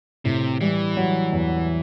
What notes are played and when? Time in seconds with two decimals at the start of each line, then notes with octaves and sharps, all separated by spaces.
0.25 A2 C3
0.61 E3 G3
0.97 F#3
1.33 E2